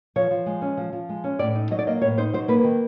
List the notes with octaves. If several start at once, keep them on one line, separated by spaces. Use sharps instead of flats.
F3 C#5
F3
G#3
C#4
F3
F3
G#3
C#4
A2 D5
D#4
F#3 D#5
D5
A#3 D#5
A2 C#5
D#4 C5
F#3 C5
A#3 B4
D#3